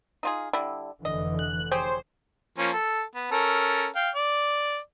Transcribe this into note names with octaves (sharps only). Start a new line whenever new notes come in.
D#4 F4 G#4
D3 G3 E4
F1 D3 E3 D#5
F#6
G4 G#4 C5 C#5
F3 A#3 C#4
A4
B3
C#4 A4 A#4
F5 G5
D5